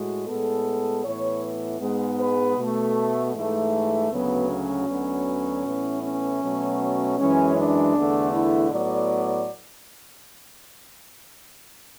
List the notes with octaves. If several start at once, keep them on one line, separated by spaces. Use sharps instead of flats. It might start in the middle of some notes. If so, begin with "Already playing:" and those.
Already playing: A2 G#3 F#4
A2 G#3 B3 A4
A2 E3 B3 C#5
G#2 G#3 B3
B4
B2 A3
G#2 E3 A3
D2 C#3 F#3 B3
C#4
D2 D3 F#3 B3
A2 E3 B3
C#4
B2 F#3 A3
F#2 E3 G#3 C#4
D4
E2 D3 A3
E4
A2 F#3 B3 D5